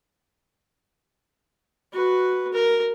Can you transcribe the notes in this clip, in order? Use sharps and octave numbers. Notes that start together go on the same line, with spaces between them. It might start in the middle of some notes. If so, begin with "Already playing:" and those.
F#4 B4
A#4